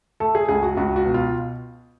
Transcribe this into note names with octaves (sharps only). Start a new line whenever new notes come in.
A3 A4
G#4
C#2 G#4
F#4
C#2 F#4
F#4
B2
F4